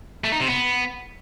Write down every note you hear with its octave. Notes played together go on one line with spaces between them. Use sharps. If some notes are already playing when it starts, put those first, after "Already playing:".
A3
D#4
C3
B3